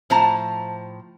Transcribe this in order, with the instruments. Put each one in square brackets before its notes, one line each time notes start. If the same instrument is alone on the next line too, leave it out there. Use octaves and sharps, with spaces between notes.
[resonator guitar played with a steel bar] A2 F3 C5 A5 A#5